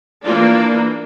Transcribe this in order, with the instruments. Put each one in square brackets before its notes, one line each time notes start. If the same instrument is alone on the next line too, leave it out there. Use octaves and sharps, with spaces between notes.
[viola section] E3 A#3 D4 F4